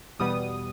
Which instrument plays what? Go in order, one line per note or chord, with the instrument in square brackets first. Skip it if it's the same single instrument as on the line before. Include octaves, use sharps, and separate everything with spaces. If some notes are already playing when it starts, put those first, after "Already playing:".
[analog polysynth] E2 B2 G3 B3 D#6